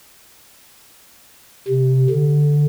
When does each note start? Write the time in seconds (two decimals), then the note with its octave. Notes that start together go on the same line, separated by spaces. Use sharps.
1.68 C3
2.10 D3